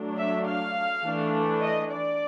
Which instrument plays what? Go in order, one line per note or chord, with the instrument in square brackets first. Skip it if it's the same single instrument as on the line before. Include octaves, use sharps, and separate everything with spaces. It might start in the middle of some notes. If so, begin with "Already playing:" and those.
Already playing: [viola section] F#3 A3 D4
E5
F5
E3 A3 D4
D#5
D5